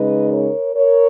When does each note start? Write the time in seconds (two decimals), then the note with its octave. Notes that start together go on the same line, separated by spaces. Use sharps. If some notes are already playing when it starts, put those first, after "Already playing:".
Already playing: C#3 G#3 D#4 B4 D#5
0.31 A#4 C#5
0.75 A#4 C#5